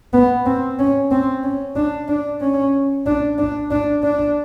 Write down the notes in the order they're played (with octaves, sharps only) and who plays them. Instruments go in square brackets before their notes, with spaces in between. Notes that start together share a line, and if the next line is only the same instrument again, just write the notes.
[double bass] B3
C4
C#4
C4
C#4
D4
D4
C#4
D4
D4
D4
D4